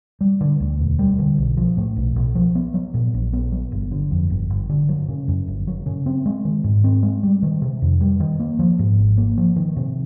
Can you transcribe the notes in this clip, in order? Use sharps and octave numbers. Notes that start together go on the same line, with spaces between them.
G3
D3
D2
E1
G3
D3
B1
F3
A2
B1
B1
F3
B3
F#3
A#2
A#1
B3
F#3
G1
D3
F2
G1
G1
D3
F#3
C#3
F#2
G1
F#3
C#3
C4
G#3
D#3
G#2
C4
G#3
G3
D#3
C3
F2
G3
D#3
A#3
F3
G#2
G#1
A#3
F3
D#3
C3